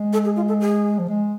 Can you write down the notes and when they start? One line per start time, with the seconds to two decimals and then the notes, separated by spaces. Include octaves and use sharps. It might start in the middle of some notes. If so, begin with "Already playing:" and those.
Already playing: G#3
0.13 A4
0.25 G#4
0.37 F4
0.48 A4
0.61 G#4
0.99 F3
1.09 G#3